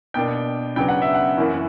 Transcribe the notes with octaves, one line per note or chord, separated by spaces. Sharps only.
B2 A#3 D4 G5
C#3 F#3 B3 D4 G5
F#5
E5
F#5
F#2 E3 A#3 C#4 E4